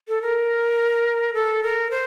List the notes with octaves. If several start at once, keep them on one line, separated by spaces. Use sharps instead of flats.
A4
A#4
A4
A#4
C5